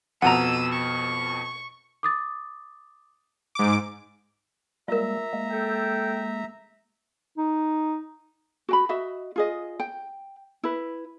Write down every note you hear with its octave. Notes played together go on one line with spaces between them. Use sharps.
F2 B2 F#5 A5 A#5 E6 D#7
C#6
D6 D#6 A6
G#2 D6
G3 G#3 A#3 F4 A#4 E5 A#5
G#3 A#3
A4 G5
D#4
F#4 G5 B5
F#4 D#5 E5
F4 G#4 D#5
G5
E4 B4